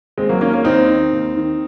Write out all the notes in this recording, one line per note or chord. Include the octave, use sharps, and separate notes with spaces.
D#2 G#3 C4
F#3 A#3
D#3 A#3 C#4
A#3 C#4
D#2 C4 D#4
D#3
D#2
D#3